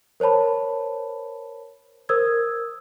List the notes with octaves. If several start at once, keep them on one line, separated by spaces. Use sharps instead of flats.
A#4 C5 C#5 A5 B5
A#4 C5 D#6 E6 G#6